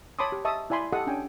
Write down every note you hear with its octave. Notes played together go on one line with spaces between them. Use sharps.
C#5 A5 B5 C6 D6 D#6
G4
D#5 E5 A5 C#6 D#6
E4 D5 G#5 B5 C6
G4 A4 D#5 F#5 A5 D#6
C#4 D4 G5 G#5